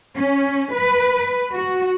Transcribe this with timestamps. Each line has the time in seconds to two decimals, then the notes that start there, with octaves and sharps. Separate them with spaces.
0.17 C#4
0.74 B4
1.54 F#4